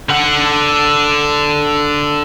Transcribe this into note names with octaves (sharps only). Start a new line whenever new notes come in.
D3 F#5